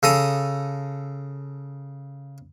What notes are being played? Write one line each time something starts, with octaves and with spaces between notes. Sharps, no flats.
C#3 A4 A#5 D#6